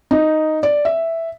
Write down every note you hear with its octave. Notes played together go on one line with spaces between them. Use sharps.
D#4
D5
E5